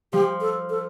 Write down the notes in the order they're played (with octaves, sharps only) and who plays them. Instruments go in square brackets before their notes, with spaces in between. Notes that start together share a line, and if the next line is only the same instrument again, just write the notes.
[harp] F3 [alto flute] G4
[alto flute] A4
A4